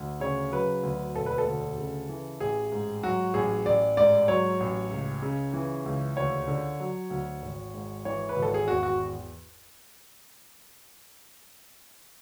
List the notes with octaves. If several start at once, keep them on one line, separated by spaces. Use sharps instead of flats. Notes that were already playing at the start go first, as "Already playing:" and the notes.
Already playing: D2
C#3 C#5
F#3 B4
D2
E1 A4
B4
A4
D2
C#3
E3
A1 G#4
G#2
F#3 F#4
A1 G#4
A1 D5
G#2 D5
F#3 C#5
A1
C#2
C#3
E3
C#2
D2 C#5
D3
F#3
D2
G#1
G#2
E3 C#5
B4
G#1
A4
G#4
E2 F#4
F#4